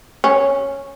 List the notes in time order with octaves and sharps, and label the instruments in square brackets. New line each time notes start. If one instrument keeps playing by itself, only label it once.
[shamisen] C#4